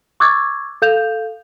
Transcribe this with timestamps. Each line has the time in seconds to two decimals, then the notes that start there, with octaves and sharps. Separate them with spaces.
0.20 C#6 D6 E6 F#6 G#6 A6
0.82 A4 F5 G6 E7 F7